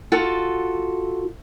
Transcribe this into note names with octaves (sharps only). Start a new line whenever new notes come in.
F4 F#4 A4